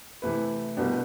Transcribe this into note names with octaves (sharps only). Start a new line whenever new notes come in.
C3 E3 A3 E4 B4
C2 B2 B3 D4 G4